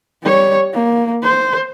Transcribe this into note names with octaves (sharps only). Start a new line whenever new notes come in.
G3 C#5
A#3
C5